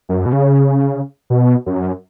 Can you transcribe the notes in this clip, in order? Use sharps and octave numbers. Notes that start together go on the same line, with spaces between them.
F#2
B2
C#3
B2
F#2